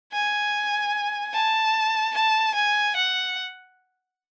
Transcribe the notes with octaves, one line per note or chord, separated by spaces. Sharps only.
G#5
A5
A5
G#5
F#5